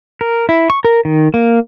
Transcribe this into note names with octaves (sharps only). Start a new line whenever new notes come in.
A#4
E4
C#6
A#4
D#3
A#3